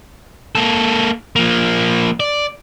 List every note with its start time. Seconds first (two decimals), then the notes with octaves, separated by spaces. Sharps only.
0.55 A#3 A4
1.36 F3 A#3
2.20 D5